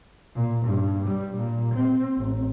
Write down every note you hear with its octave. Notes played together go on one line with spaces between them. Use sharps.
A#2
G2
G3
A#2
C4
A1